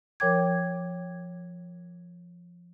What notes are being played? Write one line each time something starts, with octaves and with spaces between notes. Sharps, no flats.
F3 A#4 C#5 G5 D6 G#6